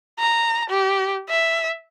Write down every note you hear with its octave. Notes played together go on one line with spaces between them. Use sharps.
A#5
G4
E5